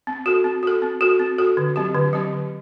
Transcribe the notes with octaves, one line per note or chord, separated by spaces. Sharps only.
C4
F#4 A4
C4
F#4 A4
C4
F#4 A4
C4
F#4 A4
D3
F#3 C4 G4
D3
F#3 C4 G4
D3